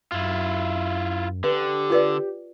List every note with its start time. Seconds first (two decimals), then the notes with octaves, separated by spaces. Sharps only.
0.12 F#2 E4 F4
1.44 D3 G4 B4
1.90 F4 B4 D5